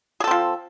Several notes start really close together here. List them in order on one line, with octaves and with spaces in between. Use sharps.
G#4 A4 C4 F3